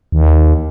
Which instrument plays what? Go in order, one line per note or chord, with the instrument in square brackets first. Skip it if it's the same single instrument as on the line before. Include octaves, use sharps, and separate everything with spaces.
[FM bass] D#2